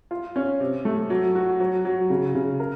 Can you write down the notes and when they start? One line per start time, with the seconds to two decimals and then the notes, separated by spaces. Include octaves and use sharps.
0.11 F4
0.36 C#4
0.60 C3
0.85 A3
1.10 F#3
1.35 F#4
1.60 F#3
1.85 F#3
2.10 C#3
2.35 C#3
2.60 A#4